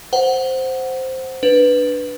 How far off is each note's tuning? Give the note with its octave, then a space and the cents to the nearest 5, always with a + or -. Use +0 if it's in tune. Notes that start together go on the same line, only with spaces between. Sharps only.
C5 +0 F#5 +0
D4 +0 B4 +0